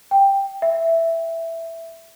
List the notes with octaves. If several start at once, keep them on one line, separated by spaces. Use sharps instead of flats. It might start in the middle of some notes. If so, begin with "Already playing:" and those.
G5
E5